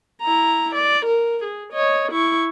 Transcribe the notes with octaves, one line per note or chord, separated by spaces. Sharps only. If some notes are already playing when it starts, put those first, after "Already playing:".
E4 A#5
D5
A#4
G#4
C#5 D#5
E4 C#6